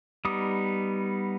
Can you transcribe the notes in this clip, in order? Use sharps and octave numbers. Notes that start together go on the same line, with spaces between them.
G3 B3 D#4 D6 D#6